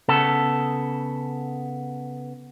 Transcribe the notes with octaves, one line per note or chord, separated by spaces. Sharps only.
C#3 B3 A4